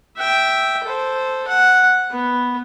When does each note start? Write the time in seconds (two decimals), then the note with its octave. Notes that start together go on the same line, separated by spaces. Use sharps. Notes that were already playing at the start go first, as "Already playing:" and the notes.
0.18 E5 G5
0.84 A4 C5
1.48 F#5
2.11 B3